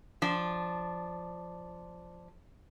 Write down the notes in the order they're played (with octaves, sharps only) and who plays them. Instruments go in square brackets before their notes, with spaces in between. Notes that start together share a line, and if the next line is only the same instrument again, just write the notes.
[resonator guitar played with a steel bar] F3 D4